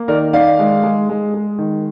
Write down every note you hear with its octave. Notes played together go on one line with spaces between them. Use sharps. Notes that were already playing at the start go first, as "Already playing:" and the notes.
Already playing: A#3
D#3 A#4 D5
D#3 D5 F5
G#3
G#3
G#3
G#3
D#3